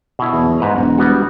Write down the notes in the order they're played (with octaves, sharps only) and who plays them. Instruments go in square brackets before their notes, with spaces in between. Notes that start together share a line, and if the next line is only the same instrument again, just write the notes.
[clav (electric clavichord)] B2 E4
[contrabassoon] E2
[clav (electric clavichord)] G#2 B4 A#5
[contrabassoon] E1 [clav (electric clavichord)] F#5
[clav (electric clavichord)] G3 B3 F#4